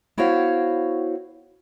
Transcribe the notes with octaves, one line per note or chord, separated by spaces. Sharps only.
B3 E4 F#4 C5 C#5 F5